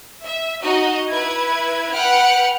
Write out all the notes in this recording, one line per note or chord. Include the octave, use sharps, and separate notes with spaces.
E5
D#4 F#4 D#5
E4 B4 G#6
B4 F#5 G5 F6